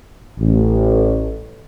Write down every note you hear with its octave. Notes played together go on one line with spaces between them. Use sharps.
A1